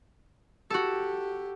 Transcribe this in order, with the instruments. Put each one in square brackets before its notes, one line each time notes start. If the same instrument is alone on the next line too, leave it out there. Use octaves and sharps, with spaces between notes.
[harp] F#4 A4 [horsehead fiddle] G4